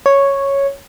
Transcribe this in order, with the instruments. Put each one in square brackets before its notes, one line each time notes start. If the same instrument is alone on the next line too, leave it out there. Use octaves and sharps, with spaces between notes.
[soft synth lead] C#5